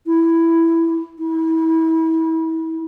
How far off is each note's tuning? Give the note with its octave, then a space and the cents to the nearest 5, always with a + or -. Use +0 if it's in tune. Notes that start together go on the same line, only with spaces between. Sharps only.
E4 +5
E4 -30